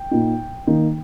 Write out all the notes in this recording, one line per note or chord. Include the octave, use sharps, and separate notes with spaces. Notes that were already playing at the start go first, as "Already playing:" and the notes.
Already playing: G5
A#2 A#3 D#4
D#3 A#3 D#4